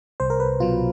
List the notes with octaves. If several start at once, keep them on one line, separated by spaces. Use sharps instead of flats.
C2 C5
A#4
B4
B2 F#3 F4